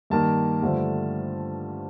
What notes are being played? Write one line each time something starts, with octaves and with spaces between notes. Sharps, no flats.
G2 D#3 A#3 A5
G2 D3 F3 A3